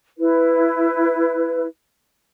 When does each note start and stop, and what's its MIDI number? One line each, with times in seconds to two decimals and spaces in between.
0.18 1.65 64
0.18 1.65 71